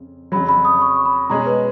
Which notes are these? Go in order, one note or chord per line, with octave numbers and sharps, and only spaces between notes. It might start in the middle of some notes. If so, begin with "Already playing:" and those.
Already playing: F2 C#3
F2 C#3 F#3 B5
B5
D#6
C#6
B5
B2 G#3 C#4 G#4 A#5
B4